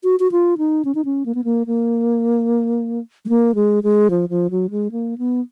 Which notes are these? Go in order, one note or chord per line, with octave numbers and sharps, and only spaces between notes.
F#4
F#4
F4
D#4
C#4
D#4
C#4
A#3
B3
A#3
A#3
G#3
A#3
G#3
G#3
F3
F3
F#3
G#3
A#3
B3